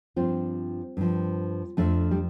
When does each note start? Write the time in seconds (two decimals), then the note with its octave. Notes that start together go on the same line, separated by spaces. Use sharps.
0.16 G2 F3 C4 F4
0.97 G2 F3
1.77 F2 F3 A3 D4
2.11 G3